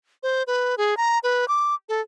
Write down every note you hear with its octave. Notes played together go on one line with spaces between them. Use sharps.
C5
B4
G#4
A#5
B4
D6
A4